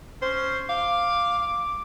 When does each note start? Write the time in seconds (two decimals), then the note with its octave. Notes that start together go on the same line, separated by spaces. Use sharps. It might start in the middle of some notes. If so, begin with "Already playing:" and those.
0.22 C#4 C5
0.69 F5 D6